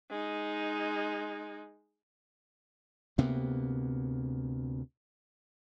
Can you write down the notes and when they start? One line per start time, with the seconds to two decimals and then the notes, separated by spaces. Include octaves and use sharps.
0.10 G#3 D#4
3.18 D2 C3 A#3 B3